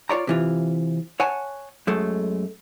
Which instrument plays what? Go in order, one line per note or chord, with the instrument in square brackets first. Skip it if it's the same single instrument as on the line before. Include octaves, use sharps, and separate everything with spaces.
[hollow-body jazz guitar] F4 C#5 D5 A#5
C3 E3 F4
C#5 F#5 G#5 A5
F#2 G#3 A3